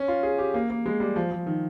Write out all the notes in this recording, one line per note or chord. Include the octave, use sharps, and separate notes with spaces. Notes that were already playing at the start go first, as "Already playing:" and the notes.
Already playing: C#4
F4
G#4
G4
A#3
A#3
G#3
G3
F3
F3
D#3